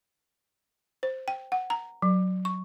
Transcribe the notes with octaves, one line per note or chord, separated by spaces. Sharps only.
C5
G5
F#5
A#5
F#3
C#6